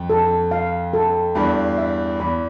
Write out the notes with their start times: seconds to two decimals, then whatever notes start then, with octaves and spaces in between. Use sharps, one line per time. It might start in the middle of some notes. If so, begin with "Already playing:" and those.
Already playing: F2
0.10 A4
0.51 F5
0.93 A4
1.35 E2 G2 B5
1.78 E5
2.20 E2 B5